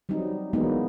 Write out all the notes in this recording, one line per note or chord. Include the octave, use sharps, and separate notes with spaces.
F#3 G3 C4 D#4
E3 F#3 G#3 A#3 B3 D#4